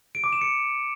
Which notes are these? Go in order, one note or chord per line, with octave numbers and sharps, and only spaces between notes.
D7
D6
E7
C#7